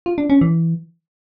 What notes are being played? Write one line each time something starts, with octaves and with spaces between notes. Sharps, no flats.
F4
D4
C#4
E3